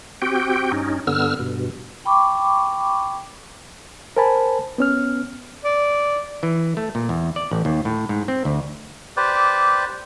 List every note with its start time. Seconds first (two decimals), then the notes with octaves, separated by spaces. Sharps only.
0.22 C4 F#4 G4 G5
0.72 G2 C#4 D#4
1.07 G2 D3 B3 E6 F6
1.39 G2 B2
2.05 G5 B5 C#6 D6
4.17 A#4 C5 G#5 A5 B5
4.78 B3 C#4 F6
5.65 D5
6.43 E3
6.77 A3
6.95 A#2
7.09 E2
7.36 D5
7.51 A1
7.65 D#2
7.85 A2
8.09 G#2
8.28 C4
8.45 D2
9.17 G4 B4 C5 D5